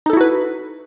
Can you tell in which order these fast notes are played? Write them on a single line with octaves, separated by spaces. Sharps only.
D#4 A4 E4 F#4 B4